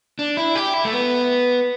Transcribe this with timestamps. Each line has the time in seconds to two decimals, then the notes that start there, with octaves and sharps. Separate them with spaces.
0.19 D4
0.37 E4
0.55 G4
0.74 E4
0.85 A3
0.93 B3